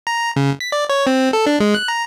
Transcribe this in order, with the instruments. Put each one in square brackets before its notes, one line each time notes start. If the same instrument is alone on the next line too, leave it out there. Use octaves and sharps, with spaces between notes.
[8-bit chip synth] A#5
C#3
B6
D5
C#5
C4
A4
D4
G#3
F#6
A#5